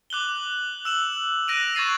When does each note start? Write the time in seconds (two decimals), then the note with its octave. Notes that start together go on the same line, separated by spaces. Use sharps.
0.10 D6 F#6 F#7 G7
0.85 E6 E7 F#7
1.48 F#6 A#6 D7 D#7 F7
1.75 C#6 G#6 A6 C7 D#7